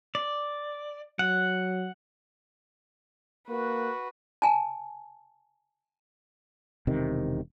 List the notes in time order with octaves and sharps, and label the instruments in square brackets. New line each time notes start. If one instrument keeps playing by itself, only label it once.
[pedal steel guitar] D5
[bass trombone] F#3 [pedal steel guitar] F#5
[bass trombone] A#3 [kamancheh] F#4 B4
[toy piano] G#5 A5
[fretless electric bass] E1 C3 D#3